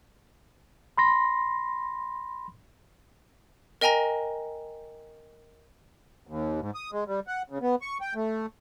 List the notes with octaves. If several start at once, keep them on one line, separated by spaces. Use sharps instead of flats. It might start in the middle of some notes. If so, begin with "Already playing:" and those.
B5 C6 A#6
A#4 D#5 G5 G#5 A#5 A#6
D#2
G#2
D#6
G#3
G3
F#5
C#3
B3
C#6
G5
A3